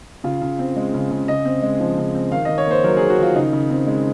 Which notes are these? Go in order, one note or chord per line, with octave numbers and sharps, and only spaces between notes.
C#3 F4
C#3
C4
G#3
C#3
C#3
C#3 D#5
C4
G#3
F3
C#3
C4
D#3 F5
D#3 D#5
C#5
A#3 C5
F#3 A#4
D#3 G#4
F#4
D#3 F4
C#3 D#4
C#3
C4
G#3